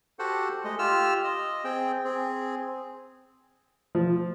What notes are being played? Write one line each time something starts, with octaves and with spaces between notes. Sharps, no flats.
F#4 G4 A4 C5 F#5
G#3 A3 D#5
F4 G4 E6 F6
D#5
C4 G#4 G5
C4 G#4
F3